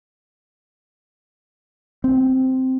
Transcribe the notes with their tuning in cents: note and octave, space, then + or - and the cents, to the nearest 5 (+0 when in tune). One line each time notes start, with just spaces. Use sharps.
C4 -5